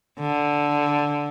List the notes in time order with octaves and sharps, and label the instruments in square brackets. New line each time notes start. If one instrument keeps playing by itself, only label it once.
[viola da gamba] D3